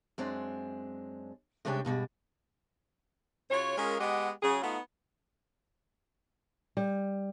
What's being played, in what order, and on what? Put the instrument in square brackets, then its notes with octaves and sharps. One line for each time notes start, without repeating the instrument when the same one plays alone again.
[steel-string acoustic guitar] F#2 G#3 C4 D4
C3 G3 G#3 C#4 D4 G5
G2 B2 G3 G#3
[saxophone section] C#3 F4 F#4 C#5
G#3 C#4 F4 G#4 A#4
G#3 B3 G4 G#4 D#5 F#5
C#3 F#3 G#4
A3 B3 D#4 F4 F#4
[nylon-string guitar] G3